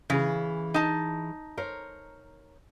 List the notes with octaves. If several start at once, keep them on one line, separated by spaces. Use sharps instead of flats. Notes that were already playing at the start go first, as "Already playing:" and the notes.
C#3 E3 G#4
D#4 A5
A#4 C5 C#5